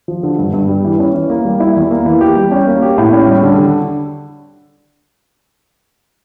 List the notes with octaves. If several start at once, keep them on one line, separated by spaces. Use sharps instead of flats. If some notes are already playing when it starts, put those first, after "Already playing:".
F3
D3
G2
G2
G3
E3
C#4
E3
A#3
G3
E4
E2
A#3
E3
G4
G3
C#4
A#3
G4
A2
C#4
G3
D3
D3